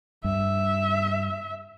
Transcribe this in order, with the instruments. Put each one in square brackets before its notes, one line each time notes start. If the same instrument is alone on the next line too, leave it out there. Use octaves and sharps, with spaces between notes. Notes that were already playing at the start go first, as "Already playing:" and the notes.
[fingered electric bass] G2 [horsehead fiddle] E5